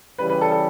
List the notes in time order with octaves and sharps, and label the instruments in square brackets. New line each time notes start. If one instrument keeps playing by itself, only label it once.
[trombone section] C#3 E3 G3 [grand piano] B4
[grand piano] B4
A4
A4